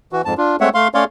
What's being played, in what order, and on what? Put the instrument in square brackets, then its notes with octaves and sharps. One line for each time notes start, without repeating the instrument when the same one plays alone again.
[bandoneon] E3 F#4
F2 G#2 A5
D4 F4
G#3 A3 C4 C#5 E5 F#5
A3 F5 C6
A3 C#4 C#5 D5 F5 C6